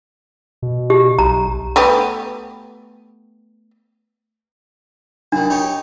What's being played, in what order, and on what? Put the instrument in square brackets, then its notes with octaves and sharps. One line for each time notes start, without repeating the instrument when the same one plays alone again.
[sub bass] B2
[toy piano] G4
[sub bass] B1 [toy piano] A#5
[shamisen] A3 B3 G4
[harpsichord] F#2 D#3 [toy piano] D4
[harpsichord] D#4 G4 C#5